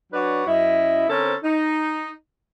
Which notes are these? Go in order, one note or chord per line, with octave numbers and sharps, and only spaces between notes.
F#3 D4 F#4 B4 C#5 D5
F#2 E4 D#5
D3 C4 C#4 A4 A#4 C5
D#4